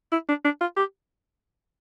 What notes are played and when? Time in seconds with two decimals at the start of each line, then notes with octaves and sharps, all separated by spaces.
0.12 E4
0.28 D4
0.45 D4
0.61 F4
0.77 G4